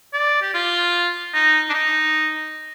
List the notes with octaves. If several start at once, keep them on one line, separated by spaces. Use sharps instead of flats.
D5
G4
F4
D#4
D4
D#4